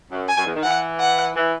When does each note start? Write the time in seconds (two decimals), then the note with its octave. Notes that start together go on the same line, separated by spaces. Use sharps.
0.10 F#2
0.28 G#5
0.37 F#2
0.46 E2
0.55 D#3
0.63 E3 F#5
1.00 F#5
1.35 E3